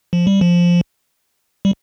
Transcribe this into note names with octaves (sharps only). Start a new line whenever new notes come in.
F3
G3
F3
G3